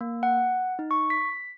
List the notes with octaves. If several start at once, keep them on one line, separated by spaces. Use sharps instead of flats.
A#3
F#5
D#4
C#6
B6